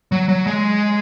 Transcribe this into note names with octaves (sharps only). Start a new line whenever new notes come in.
F#3
F#3
G#3